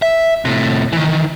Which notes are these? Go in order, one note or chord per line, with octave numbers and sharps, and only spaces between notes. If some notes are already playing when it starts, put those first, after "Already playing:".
E5
A2 C3
D#3 E3